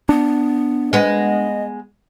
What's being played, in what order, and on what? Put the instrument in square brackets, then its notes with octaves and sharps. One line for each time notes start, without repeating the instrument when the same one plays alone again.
[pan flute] B3 [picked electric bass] D4
[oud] G#3 B3 [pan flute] D#5